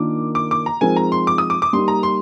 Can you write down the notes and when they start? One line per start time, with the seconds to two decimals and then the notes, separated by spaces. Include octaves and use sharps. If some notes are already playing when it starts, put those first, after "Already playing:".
Already playing: D#3 A#3 D4 F4 A#4 D6
0.35 D6
0.51 D6
0.66 A#5
0.81 F3 G#3 C4 D#4 A#4 G#5
0.96 A#5
1.12 C6
1.27 D6
1.38 D#6
1.50 D6
1.62 D6
1.73 G3 A#3 D#4 C6
1.88 A#5
2.03 C6